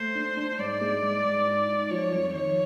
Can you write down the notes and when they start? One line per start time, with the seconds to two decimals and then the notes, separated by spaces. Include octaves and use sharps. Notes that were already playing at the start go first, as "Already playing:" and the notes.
Already playing: A3 C5
0.15 D4
0.37 D4
0.58 G#2 D5
0.81 G#3
1.03 G#2
1.24 G#2
1.47 D#4
1.68 D#4
1.90 F3 C#5
2.12 F2
2.34 D#3 C#5